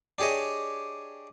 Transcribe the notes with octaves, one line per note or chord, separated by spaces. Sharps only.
D4 G4 G#4 C#5 D#5